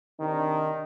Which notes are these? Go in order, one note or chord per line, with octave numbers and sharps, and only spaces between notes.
C3 D#3 D4 D#4